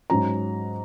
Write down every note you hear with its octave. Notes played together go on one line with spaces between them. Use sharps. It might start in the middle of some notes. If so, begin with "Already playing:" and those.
G#2 F#3 C#4 A#5